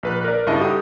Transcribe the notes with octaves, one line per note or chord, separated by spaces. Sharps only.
A#1 B4 F#6
A#4 D5
G2 C#3 E4 D#5 E5 A5
D#4 F#4 G4 A4 D#6